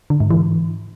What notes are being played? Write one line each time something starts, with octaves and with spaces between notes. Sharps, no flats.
D3
G#2
E3